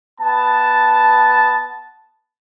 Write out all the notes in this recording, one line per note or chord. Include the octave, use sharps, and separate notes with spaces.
B3 A5